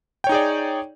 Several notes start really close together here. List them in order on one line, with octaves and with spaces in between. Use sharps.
G5 C#5 D#4 G#4 D5